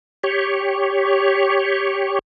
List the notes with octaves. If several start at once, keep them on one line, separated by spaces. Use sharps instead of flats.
G4 C#5